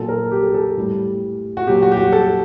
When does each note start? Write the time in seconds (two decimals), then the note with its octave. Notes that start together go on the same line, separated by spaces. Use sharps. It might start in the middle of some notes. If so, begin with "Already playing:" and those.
Already playing: A#2 F#3 A4
0.08 A#4
0.31 G4
0.43 A4
0.54 A4
0.77 A2 G3
1.57 F#4
1.67 A#2 F#3 G4
1.83 F#4
1.92 G4
1.97 F#4
2.12 A4